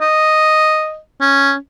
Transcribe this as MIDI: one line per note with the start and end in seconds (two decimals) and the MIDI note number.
0.01 0.98 75
1.21 1.55 61